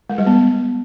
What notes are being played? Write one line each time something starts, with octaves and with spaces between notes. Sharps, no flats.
G#3
G3
B3